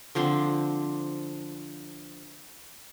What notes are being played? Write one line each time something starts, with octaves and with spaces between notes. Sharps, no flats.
D3 F3 C4 D4